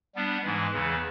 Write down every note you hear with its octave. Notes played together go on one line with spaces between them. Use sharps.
G3 B3 D4
G#2 E3 G#3
E2 C#3 E3